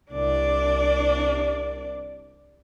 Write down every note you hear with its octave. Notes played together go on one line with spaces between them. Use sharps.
C2 D4 D5